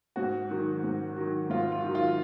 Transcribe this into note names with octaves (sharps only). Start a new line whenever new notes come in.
G#2 F#4
D#3 F#3
G#2
D#3 F#3
G#2 F4
F4
D#3 F#3
F4